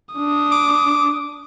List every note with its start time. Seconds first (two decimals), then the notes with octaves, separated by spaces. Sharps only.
0.15 D4 D#6
0.52 D6